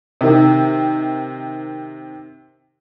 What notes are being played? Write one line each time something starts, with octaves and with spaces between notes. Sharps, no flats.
C3 D#3